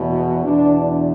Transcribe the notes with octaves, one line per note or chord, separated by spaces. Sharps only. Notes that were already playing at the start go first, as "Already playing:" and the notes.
Already playing: E2 B2
E2 B2 D4